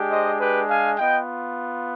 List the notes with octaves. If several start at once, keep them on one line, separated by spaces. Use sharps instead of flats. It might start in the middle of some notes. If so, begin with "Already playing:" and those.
Already playing: G#3 D4 G4
C5 D#5
G4 B4
F5 G#5
B3 F4 D#5 G5